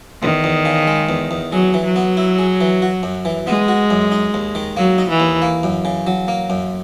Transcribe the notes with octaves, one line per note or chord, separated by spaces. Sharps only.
E2 D#3
E2
C#3
G#3
E2
E2
F#3 G#4
E3
F#3
B3
E4
G#4
E3
F#4
F#2
E3
G#3 B3
F#4
F#2
D#4
D#2
D#3
F#3 A#3
D#4
E3
D#2
A#3
F#2
C#3
F#3
A#3
F#2